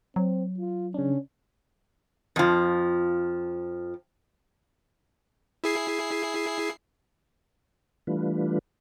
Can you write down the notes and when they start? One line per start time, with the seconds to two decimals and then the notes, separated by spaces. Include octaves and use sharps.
0.16 F#3 C4
0.58 F4
0.94 C#3 C#4 D4
2.36 F2 F3
5.64 E4 G#4 C7
8.07 E3 G3 A3 D4 F4 B4